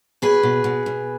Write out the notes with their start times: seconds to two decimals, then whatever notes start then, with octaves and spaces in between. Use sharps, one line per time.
0.22 B2 G#4 B4
0.43 B2
0.64 B2
0.86 B2